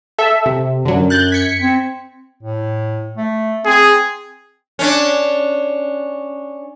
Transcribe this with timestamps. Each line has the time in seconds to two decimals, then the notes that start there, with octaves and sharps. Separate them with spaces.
0.18 A4 E5
0.46 C3
0.85 F#2 D3 F#3
1.10 F#6 G6 A6
1.30 G#6 B6 C#7
1.61 C4
2.43 A2
3.17 A3
3.65 C4 G#4
4.79 C#4 D4